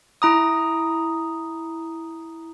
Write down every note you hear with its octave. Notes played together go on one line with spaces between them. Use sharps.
E4 A#5 D#6